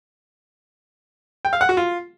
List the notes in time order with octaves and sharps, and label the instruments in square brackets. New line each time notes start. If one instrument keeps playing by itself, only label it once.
[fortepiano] G5
F5
F#5
F#4
F4